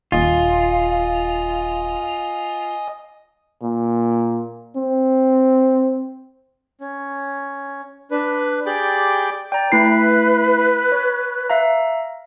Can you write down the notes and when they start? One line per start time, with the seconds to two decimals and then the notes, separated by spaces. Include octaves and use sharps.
0.12 D#1 F4 D#5 G#5 D#6
3.63 A#2
4.76 C4
6.81 C#4
8.11 D4 B4
8.66 G4 G#4 D5 G5 B5 D6
9.52 D5 G5 A#5
9.72 A3 E4 B4 C7
10.92 C#5
11.50 E5 F5 A#5